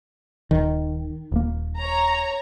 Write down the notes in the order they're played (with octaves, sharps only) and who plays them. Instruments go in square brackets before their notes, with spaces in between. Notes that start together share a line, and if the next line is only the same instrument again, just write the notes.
[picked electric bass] D#1 [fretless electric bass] D#3
[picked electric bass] D#1 A#3
[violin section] C#5 A#5